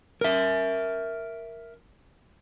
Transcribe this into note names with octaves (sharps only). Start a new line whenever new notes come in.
A#4 E5